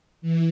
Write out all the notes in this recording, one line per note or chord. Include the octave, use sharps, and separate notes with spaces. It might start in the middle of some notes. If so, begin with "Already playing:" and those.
E3